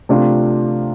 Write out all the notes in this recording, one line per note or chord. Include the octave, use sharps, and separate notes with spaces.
C3 F3 A3 D4 F4